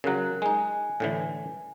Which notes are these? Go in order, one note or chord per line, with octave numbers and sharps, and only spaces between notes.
C#3 F#3 A#4 F#6
G#3 D#4 G#5
A2 D3 E3